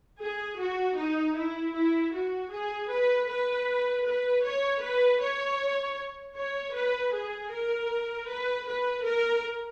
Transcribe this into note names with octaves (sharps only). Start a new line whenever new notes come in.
G#4
F#4
D#4
E4
E4
F#4
G#4
B4
B4
B4
C#5
B4
C#5
C#5
B4
G#4
A#4
B4
B4
A#4